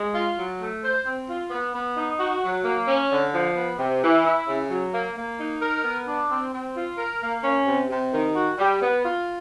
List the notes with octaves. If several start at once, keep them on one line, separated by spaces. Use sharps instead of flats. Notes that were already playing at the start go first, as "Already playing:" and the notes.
Already playing: G#3
F4
F#3
A3
C5
C4
F4
B3
B3
D#4
F#4
F#3
A#3
C#4
D3
F3
B3
C3
E3
E4
C#3
F#3
A#3
A#3
D#4
A#4
B3
D4
C4
C4
F4
A#4
A#3
C#4
C3
C3
D#3
F#4
G3
B3
F4